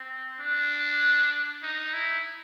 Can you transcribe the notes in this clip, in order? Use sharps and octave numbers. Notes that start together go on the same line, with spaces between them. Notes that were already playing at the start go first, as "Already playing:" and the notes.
Already playing: C4
D4
D#4
E4